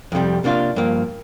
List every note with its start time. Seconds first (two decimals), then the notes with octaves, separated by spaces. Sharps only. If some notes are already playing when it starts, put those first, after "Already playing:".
0.12 F2 C3 G3
0.44 C3 A#3 D4 F4
0.76 G2 F3 A#3